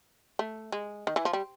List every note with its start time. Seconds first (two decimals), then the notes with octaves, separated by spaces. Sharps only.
0.39 A3
0.72 G#3
1.07 D#3
1.16 E3
1.25 F3
1.33 G3